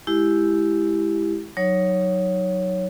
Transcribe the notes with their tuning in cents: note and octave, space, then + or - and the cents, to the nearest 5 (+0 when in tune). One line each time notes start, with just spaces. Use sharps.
G#3 +10 E4 +0 G4 +0
F#3 +0 D#4 +0 C#5 +0